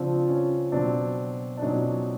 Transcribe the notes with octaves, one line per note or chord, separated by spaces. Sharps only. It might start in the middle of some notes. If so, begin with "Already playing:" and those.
Already playing: C#3 F3 C4 D4 F4
C#4
B2 F#3 C4 D4
D4
B2 F#3 C#4 D#4